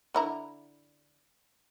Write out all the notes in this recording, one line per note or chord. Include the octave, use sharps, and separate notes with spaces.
D3 E4 A#5